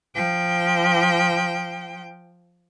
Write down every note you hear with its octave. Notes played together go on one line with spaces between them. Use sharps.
F3 G5